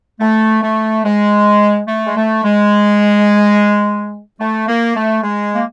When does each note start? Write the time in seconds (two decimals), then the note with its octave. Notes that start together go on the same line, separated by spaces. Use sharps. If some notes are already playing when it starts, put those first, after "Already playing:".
0.20 A3
0.62 A3
1.05 G#3
1.88 A3
2.06 G#3
2.16 A3
2.44 G#3
4.40 A3
4.68 A#3
4.96 A3
5.22 G#3
5.55 A#3